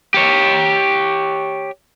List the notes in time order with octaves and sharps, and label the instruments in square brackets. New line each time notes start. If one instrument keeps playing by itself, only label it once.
[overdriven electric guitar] G4 C#5